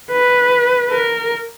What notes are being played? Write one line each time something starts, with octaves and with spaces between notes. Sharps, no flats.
B4
A#4